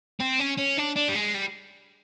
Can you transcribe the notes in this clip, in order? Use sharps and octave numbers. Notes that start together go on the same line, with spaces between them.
C4
C#4
C#4
D4
D4
G3
G#3
G3